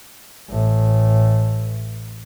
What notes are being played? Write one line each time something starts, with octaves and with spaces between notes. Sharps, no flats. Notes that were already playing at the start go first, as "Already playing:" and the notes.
A1 A2